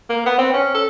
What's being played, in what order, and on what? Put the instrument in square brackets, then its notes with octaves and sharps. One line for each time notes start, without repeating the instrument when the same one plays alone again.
[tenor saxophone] A#3
B3
C4
C#4
A4